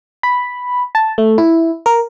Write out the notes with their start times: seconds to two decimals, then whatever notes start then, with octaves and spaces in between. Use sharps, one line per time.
0.23 B5
0.95 A5
1.18 A3
1.38 E4
1.86 A#4